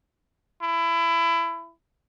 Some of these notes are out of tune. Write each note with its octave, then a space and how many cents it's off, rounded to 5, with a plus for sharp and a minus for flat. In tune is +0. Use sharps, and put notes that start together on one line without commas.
E4 +25